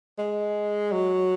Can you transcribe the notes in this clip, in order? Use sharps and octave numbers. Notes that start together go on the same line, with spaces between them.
G#3
F#3